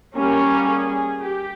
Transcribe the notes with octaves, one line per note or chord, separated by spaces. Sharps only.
G3 A#3 C#4 A#4
G#4
G4